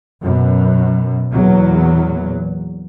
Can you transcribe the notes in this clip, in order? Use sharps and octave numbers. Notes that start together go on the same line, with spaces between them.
F#2 B2
E2 A#2 F#3